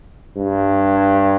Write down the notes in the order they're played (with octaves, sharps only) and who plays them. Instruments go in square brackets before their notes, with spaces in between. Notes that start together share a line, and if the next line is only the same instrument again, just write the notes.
[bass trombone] G2